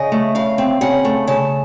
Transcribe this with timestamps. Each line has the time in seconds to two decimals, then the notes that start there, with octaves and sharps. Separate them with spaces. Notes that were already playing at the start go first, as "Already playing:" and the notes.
Already playing: C#3 D#5
0.12 A3
0.35 C#3 F5
0.58 C4
0.81 C#3 F#5
1.05 A3
1.27 C#3 A5